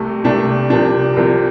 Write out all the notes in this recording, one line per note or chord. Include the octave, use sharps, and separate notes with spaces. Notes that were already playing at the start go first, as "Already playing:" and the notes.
Already playing: C2 C3 A3
C2 C3 A3 D4 G4
C2 C3 F3 D4
C2 C3 F3